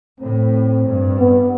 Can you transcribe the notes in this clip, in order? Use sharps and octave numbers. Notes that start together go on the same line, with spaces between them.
A2 C4
G2
B3